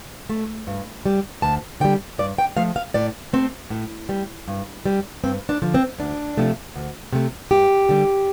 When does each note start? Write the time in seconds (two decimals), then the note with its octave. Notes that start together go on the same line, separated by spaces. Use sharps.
0.29 A3
0.67 G2
1.06 G3
1.42 D2 A5
1.80 D3 G3 G5
2.18 G2 D5
2.38 G5
2.56 F3 A3 F5
2.76 F5
2.94 A2 D5
3.33 A3 C4
3.70 A2
4.09 G3
4.48 G2
4.86 G3
5.24 G2 C4
5.49 D4
5.62 D3 F3
5.74 C4
5.99 D2 D4
6.37 C3 F3 A3
6.75 D2
7.13 C3 A3
7.51 G2 G4
7.89 D3 G3